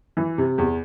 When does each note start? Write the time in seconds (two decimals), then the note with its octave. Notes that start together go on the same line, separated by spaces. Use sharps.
0.17 E3
0.38 C3
0.58 E2